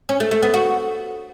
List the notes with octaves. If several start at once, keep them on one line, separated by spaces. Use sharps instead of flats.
C#4
A3
A3
B3
F#4